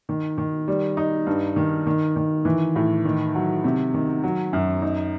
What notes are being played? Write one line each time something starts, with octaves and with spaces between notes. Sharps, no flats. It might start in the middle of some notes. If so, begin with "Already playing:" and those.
D#3
D#3
G3
D#4
G2
D#3
D#3
D#3
E3
A2
D#3
F#3
C3
D#3
F#3
F#2
D#4